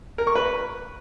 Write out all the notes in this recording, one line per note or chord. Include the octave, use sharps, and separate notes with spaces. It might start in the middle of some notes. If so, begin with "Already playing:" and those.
A#4
C#6
B4